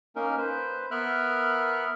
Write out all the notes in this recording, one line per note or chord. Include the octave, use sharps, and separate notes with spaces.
A#3 C#4 D#4 A#4
B4 C5
B3 A#4 E5 B5 F6 F#6